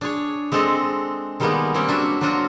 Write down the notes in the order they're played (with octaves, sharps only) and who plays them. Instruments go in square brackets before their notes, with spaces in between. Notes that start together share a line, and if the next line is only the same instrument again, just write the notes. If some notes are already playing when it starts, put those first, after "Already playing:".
[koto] D4 G#4 C#5
G#3 C4 D4 A4 D#5
D#3 G3 G#3 A#3 B3 D#4
G3 A#3 C4 C#4 C#5
F#3 D4 F#4 E5
F#3 C4 D4 F4 F#4 A#5